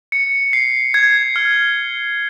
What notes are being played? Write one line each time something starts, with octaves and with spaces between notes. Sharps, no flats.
C#7
C7
G#6
F6